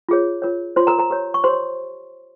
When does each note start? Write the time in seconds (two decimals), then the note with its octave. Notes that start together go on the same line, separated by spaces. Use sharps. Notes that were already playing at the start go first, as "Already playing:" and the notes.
0.09 F4 G#4 C#5
0.42 F4 A#4 C#5
0.76 F4 A#4 C5 C#5 C6
0.87 A#4 A#5
0.99 A#4 A#5
1.10 G4 A#4 C#5
1.34 C#6
1.44 G4 A#4 C5 C#5 C6